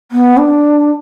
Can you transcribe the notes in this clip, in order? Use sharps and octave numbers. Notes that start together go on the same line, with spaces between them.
B3
D4